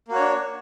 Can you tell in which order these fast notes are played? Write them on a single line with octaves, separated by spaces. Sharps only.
A#3 F#4 C#5 D4